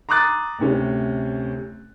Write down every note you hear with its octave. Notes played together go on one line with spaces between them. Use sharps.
A#5 C6 D6 D#6 F#6 A6
D2 A2 C3 C#4